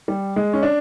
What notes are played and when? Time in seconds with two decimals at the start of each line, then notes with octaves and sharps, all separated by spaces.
0.08 G3
0.36 G#3
0.53 C#4
0.63 D4